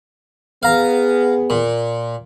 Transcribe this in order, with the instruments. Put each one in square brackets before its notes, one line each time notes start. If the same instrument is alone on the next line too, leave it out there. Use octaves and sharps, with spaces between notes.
[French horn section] B3 G#4 [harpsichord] F5 A#5
[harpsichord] A#2